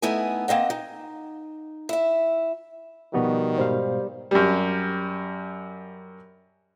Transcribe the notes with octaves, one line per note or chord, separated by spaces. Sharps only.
A3 B3 D#4 E4 G#5
A#3 C4 D#5 F#5
D#4
E4 E5
B2 D#3 F3 G3 B3 F#4
G#2 B2 G3 C5 F5
F#2 G3